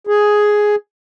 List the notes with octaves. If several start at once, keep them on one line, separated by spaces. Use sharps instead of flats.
G#4